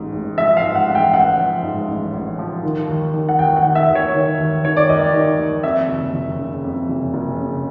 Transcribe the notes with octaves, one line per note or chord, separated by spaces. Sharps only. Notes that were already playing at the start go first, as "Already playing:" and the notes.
Already playing: A1 G#2
A1
F3 E5
F5
G#2
F#5
A1
G5
A1 F#5
F3
G#2
A1
A1
F3
D#3
D#2
D#3
F#5
D#2 G5
F#5
D#3
E5
D#2
C#5
D#3
D#2
D#3 C#5
D5
D#2 D#5
D#3
D#2
F2 E5
F#1
F#1
C#3
F2
F#1
F#1
C#3